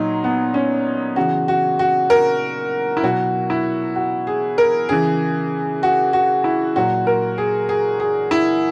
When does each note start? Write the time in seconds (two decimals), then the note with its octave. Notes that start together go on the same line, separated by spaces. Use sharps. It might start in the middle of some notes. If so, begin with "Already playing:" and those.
Already playing: A#2 F#3 D#4
0.24 B3
0.54 C#4
1.16 C#3 E3 F#4
1.48 F#4
1.79 F#4
2.10 A#4
2.97 E4
3.03 B2 F#3 F#4
3.50 E4
3.96 F#4
4.27 G#4
4.58 A#4
4.89 C#3 E3 G#4
5.83 F#4
6.13 F#4
6.44 E4
6.76 A#2 F#3 F#4
7.07 A#4
7.38 G#4
7.69 G#4
8.00 G#4
8.31 E4